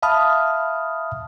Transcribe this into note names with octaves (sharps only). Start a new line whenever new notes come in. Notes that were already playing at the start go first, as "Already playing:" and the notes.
E5 F5 A5 B5 D#6 F6